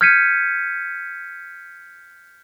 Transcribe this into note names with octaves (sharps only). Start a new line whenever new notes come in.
F6 G6 G#6 B6 C#7 D#7